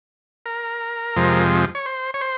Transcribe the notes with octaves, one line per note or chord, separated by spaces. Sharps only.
A#4
F2 C3 F3 G#3
C#5
C5
C#5
C5